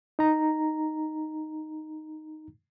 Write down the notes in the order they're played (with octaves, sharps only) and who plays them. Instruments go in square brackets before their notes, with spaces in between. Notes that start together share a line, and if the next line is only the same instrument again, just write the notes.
[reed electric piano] D#4 A#5